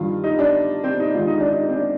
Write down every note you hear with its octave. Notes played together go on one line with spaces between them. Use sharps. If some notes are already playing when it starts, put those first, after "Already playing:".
Already playing: G2 D#3 F4
D#4
D4
C4
D#4
G#2 D#3 F4
D#4
D4
D#4
C4
D4